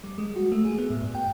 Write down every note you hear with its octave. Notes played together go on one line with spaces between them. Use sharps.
G3
G#3
F#4
A3
G#4
B3
A2
G2
G5